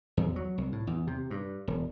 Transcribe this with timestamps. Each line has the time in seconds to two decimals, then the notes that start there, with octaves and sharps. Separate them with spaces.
0.17 E2
0.36 F#3
0.58 C2
0.72 A2
0.87 E2
1.07 C3
1.30 G2
1.68 E1